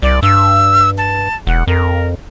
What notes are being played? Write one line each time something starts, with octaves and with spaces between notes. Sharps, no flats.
C2 D5
G2 E6
A5
E1 F#5
F2 A#4